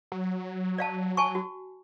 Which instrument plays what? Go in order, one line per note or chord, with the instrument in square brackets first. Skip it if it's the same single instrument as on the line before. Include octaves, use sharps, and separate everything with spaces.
[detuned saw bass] F#3
[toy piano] D5 F5 A5
G#5 A5 C#6
F#4